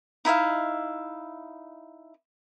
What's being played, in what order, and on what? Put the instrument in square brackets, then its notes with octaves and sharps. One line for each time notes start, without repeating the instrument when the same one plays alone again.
[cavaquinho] D#4 E4 E5 F5